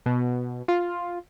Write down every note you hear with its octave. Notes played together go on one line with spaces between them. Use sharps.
B2
F4